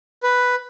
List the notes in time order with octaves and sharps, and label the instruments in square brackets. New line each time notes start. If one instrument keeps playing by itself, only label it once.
[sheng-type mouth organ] B4